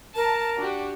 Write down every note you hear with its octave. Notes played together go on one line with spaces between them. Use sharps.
A#4 A5
D4 F#4 G4